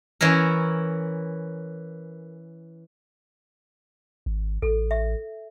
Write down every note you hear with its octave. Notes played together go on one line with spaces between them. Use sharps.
E3 C#4 E4 A#4
G#1
A1 A4
E5